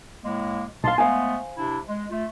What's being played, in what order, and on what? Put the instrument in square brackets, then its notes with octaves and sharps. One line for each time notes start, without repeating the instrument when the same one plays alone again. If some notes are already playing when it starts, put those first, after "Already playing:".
[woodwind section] A2 G#3 A#3
[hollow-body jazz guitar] B1 F5 [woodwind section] A5 C6
[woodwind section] G#3 A3 B3 [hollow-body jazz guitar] C5 F5 G#5
[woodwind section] C3 D4 E4
G#3
A3 F4